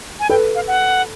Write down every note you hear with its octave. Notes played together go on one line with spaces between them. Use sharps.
G#5
A4 B4 G5
F5
F#5